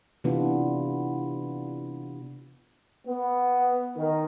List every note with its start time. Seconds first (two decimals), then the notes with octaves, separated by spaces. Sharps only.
0.24 C3 E3 B3 D4 F4
3.06 B3
3.96 D#3